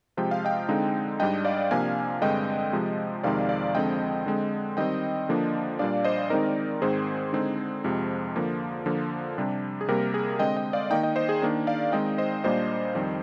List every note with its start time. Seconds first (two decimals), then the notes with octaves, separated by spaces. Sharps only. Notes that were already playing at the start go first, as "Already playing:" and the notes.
0.17 C3 F3 G#3 G5
0.31 F5
0.45 D#5 G5
0.69 D3 G#3 C4 D#4
1.20 G#2 G3 D4 D#5 G5
1.45 D5 F5
1.71 C3 F3 A#3 D4 F5 G#5
2.22 G2 D3 G#3 C4 D#5 G5
2.73 C3 F3 G#3
3.23 F2 C3 D#3 G#3 C4 D5 F5
3.49 D5 F5
3.75 F2 D3 G#3 C4 D#5 G5
4.26 D3 G#3 C4
4.77 D#3 G3 C4 D#5 G5
5.29 D3 F3 A#3 D4
5.79 A#2 G3 D4 D5 F5
6.04 C5 D#5
6.30 D#3 G#3 C4 D#4 A#4 D5
6.82 G#2 D#3 G#3 C4 G#4 C5
7.33 D3 G#3 C4 D#4
7.84 F2 C3 F3 G#3
8.36 D3 F3 A#3
8.86 D3 F3 A#3
9.38 C3 G3 D4
9.81 G#4
9.88 C3 G3 A#3 G4 A#4
10.14 G#4
10.39 D3 G#3 C4 D#5 G5
10.56 D#5 G5
10.73 D5 F5
10.90 D#3 A#3 D#4 D#5 G5
11.03 D#5 G5
11.16 C5 D#5
11.29 G#4
11.42 D#3 A#3 D4
11.67 D5 F5
11.92 D#3 G#3 C4 D#4 D#5 G5
12.18 C5 D#5
12.44 A#2 G3 A#3 D4 C5 D#5
12.95 F2 D#3 G3 C4